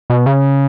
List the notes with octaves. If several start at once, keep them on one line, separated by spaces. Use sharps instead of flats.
B2
C#3